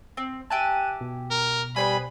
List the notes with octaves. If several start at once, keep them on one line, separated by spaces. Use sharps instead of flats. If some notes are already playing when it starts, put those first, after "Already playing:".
C4
G4 E5 G#5 A5 F#6 D#7
B2
A#4
G3 B4 C5 G#5 B5 D#6